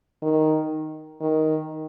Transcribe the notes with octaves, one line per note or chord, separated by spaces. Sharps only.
D#3
D#3